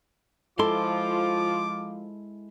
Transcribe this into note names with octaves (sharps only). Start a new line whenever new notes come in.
F3 G#3 E4 F4 A4 C6 D6